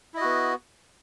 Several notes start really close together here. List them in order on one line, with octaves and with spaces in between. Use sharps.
E4 D#5 F#4 B3